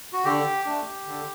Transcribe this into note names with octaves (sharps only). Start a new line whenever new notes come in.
F#4
D3 G4
A3 D4
D3